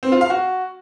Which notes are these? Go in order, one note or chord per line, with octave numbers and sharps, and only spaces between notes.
C4
F4
F5
F#4